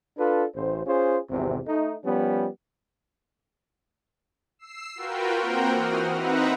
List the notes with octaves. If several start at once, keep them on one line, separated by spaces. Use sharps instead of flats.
D4 F4 A4 B4
A1 C5
C#4 F4 G#4 C5
G#1 E2 C3
A3 D#4
F3 G3 B3 C#4
E6 C7
F4 F#4 A#4 B4 G5
A#3 C4 A#4 C5 F#5 G5
E3 F#4 D#6 F6
C4 D#4 B4 E5 F#5 A#5